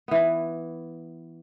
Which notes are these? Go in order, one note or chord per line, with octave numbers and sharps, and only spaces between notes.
E3 B3